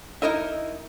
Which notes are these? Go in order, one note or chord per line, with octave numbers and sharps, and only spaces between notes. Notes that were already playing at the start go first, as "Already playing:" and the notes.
D#4 E4 A#4 D#5 E5